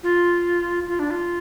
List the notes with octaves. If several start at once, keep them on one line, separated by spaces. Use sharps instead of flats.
F4
F4
D4
F4